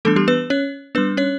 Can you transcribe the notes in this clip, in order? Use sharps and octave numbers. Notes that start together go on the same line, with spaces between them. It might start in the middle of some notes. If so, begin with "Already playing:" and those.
E3 G3 A3 B3 D4 A4
G3 G4
B3 B4
C#4 C#5
G3 B3 D4 B4
C#4 C#5